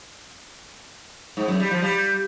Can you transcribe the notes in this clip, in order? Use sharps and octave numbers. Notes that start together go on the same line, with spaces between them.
G#2
F#2
G3
F3
G3